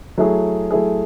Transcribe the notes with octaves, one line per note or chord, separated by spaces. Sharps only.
F#3 A3 E4 G#4
F#3 A3 E4 G#4